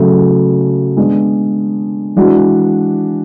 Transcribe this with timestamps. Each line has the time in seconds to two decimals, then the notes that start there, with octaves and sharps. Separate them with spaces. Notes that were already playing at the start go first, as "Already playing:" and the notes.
Already playing: C#3 F#3 A3
0.97 G#3 B3 D4
2.16 E3 G#3 D4 F#4